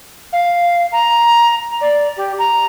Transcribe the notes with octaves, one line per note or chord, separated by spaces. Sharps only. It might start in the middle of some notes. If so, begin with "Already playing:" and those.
F5
A#5
D5
G4
A#5